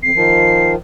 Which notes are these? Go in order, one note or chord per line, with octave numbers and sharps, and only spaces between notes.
F2 C7
D#3 F3